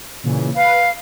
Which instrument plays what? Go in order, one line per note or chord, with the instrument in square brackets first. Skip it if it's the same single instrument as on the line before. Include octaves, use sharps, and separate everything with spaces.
[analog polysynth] A#2 C#3 E3
[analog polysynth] B4 [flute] F5